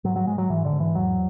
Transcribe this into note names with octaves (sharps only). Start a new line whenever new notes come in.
G#2 F#3
F#3
G#2 G#3
F#3
G#2 E3
D3
G#2
E3
E2 F#3